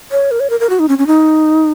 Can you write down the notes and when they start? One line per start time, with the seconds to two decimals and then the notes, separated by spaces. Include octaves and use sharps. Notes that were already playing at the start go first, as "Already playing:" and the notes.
0.11 C#5
0.31 A#4
0.40 C#5
0.50 A#4
0.60 A#4
0.70 F#4
0.79 D#4
0.88 C#4
0.99 C#4
1.07 D#4